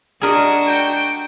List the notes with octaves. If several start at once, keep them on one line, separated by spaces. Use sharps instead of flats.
D4 F#4 G#4 A#4 D#5
G5